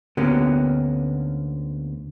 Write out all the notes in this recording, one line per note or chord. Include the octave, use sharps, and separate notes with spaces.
D2 D3 A#3 B3 C#4 G4